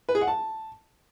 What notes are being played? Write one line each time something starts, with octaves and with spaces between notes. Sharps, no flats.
B4
G#4
F#5
A5